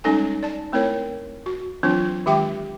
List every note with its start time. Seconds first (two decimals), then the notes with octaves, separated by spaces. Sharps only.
0.04 G3 G#3 C#4 D#4 A4 G#5
0.43 D5 A5
0.72 A3 C4 E4 A#4 C#5
1.46 F#4
1.83 E3 F#3 C4 D4 F4
2.26 D#3 G#3 G4 E5 G5 D6